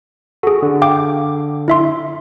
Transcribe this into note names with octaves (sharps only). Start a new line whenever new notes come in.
F#4 G#4 A4
D3
F5 G5 D6
E4 E5 C6